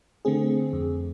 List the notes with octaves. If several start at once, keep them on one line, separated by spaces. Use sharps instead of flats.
D3 A3 C4 G#4
F2